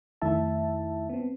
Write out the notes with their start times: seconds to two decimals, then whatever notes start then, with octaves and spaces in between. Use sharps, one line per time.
0.22 F2 D#3 A3 E4 E5 A5
1.09 B3 C4